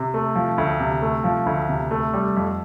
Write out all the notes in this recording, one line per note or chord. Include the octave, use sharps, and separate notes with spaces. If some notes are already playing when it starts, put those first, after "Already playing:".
Already playing: C3
A3
F3
D2
C3
A3
F3
D2
C3
A3
G3
F2